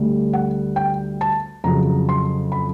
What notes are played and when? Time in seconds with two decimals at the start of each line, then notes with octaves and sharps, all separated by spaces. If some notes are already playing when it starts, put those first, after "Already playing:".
Already playing: D2 D3 G3
0.33 F#5
0.76 G5
1.21 A5
1.64 F2 C#3 F#3 A#5
2.09 C6
2.52 B5